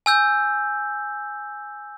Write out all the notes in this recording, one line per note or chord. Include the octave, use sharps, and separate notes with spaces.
G#5 E6 G6